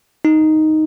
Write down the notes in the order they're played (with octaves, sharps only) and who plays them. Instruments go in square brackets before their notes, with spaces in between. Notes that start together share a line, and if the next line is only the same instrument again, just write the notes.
[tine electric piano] D#4